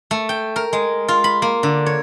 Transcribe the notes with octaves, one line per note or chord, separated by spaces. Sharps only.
A3
G5
A#4
G#3
F4
B5
A#3
D3
C#5